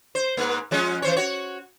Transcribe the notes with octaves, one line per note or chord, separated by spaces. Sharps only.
C5
G#2 A#3
F3 G#3 C#4
E3 C5 C#5
F#4 C#5